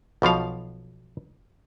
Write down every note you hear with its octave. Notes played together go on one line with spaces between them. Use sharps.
B1 B2 F3 F5